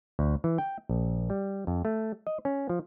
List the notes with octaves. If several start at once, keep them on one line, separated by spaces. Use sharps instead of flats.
D2
E3
G5
A#1
G3
F2
A3
D#5
C#4
F3